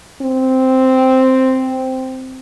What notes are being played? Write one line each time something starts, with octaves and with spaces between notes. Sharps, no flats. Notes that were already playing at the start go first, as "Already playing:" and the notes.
C4